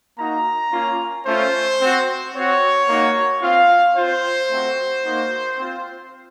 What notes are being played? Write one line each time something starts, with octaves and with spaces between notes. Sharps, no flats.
A#3 D#4 F#4 A#5
A#3 C#4 F4
A3 C#4 F4 C5
C4 F#4
C4 F#4 C#5
A#3 D#4 F#4
C4 F4 F5
C4 F4 C5
A3 C4 F#4
A#3 D#4 F#4
C4 F4